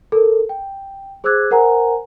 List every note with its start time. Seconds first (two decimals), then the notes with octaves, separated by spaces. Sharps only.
0.12 A4 A#4
0.49 G5
1.24 G#4 C5 D6 E6 F#6 G#6
1.51 A#4 C5 F#5 G#5 A#5